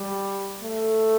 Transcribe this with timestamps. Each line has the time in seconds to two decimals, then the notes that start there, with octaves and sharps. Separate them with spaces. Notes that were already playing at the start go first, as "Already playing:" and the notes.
Already playing: G3
0.63 A3